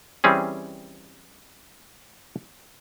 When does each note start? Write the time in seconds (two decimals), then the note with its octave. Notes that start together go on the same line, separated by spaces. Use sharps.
0.24 E3 G3 C4 C#4 G#4